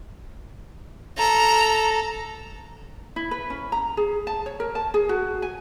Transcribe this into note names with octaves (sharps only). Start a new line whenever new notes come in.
A4 A#5
E4
B4
C#4
A#5
G#4
A5
C#5
A#4
A5
G#4
F#4
G#5